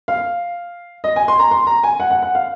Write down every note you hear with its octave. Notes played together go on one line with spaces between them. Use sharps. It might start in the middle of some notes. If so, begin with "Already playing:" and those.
F5
D#5
G#5
C6
A#5
C6
A#5
G#5
F#5
F#5
F#5
F5